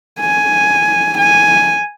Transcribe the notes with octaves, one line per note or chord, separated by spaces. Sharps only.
G#5
G#5